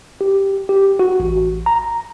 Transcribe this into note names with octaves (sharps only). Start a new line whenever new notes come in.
G4
G4
F#4
A1
A#5